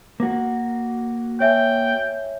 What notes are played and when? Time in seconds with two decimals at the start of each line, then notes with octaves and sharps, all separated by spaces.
0.20 A#3 F#4
1.40 C#5 E5 G5 G#5